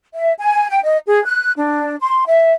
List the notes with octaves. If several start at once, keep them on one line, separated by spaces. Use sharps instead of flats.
E5
G#5
G5
D#5
G#4
F#6
D4
C6
E5